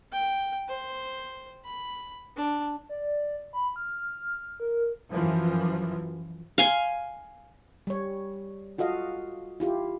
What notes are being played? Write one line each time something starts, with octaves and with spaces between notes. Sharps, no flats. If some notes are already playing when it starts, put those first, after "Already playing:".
G5
C5
B5
D4
D5
B5
F6
A#4
F#2 E3 F3
F5 G#5 C6
G3 C#5
F4 F#4 A4 D#5 F5
E4 F4 G4